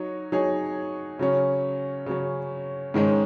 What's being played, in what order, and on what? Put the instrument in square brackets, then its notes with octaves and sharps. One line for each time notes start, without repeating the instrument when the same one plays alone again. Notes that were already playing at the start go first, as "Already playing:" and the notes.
Already playing: [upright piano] F#3 D#4 C#5
F#3 D#4 G#4 C#5
C#3 F#3 C#4
C#3 F#3 C#4
G#2 D#3 G#3 C#4